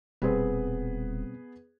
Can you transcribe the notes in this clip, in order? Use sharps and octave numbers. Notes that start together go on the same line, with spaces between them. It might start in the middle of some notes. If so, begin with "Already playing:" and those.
D#1 B2 G3 B3 C4 G#4 B4